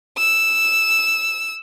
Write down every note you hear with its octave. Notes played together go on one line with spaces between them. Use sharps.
E6